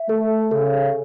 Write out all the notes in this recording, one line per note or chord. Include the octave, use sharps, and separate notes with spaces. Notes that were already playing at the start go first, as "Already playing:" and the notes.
Already playing: E5
A3 A4
C#3 A4